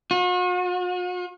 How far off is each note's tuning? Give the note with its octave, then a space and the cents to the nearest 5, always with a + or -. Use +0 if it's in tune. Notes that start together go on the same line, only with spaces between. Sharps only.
F#4 -45